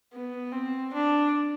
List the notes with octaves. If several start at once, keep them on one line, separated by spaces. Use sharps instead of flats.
B3
C4
D4